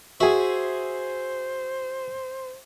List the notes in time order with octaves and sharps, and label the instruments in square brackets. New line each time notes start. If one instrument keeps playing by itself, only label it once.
[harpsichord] F#4 [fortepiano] G#4 E5 [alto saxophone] C5